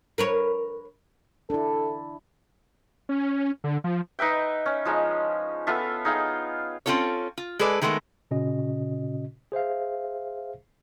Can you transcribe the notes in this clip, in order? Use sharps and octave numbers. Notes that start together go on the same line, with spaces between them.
A#4 B4 C#5
D4 E4 A4
C#4
D3
F3
D#4 B4 E5 G5
C#4
F3 G#3 D#4
B3 F4 A4 E5
D#4 G#4 F5 G5
C4 C#4 F4 A4 C#5
F4
G#3 G#4 A4 B4 D5
D#3 G#3 A3 B3 A#4
A#2 C#3 C#4 F#4 D#5
G#4 C5 E5 F5